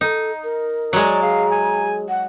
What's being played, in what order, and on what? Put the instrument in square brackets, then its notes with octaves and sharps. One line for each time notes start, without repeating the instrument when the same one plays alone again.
[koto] D#4 [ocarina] A4
[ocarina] A#4
[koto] F#3 G#3 [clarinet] D5 [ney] A#5
[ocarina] G#4 [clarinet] F5
[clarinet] G#5
[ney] F#5